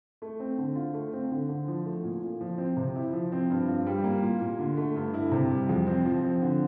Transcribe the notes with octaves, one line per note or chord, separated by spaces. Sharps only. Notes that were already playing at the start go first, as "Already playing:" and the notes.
A3
C4
D3
F4
A3
C4
D3
D3
F3
A3
A#2
A#2
F3
C4
C3
E4
F3
C4
G2
F4
G3
A#3
A#2
A#2
D3
A3
G2
E4
C3
G3
F2
C4
F3
C4
D3